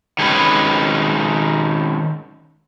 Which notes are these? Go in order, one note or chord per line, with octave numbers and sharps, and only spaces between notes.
D#3 G#3 C#4 B4